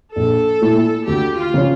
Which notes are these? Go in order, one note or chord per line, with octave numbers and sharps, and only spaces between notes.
A#1 A4
A#2 A3 E4
D2 G4
F4
C#3 F3 C#4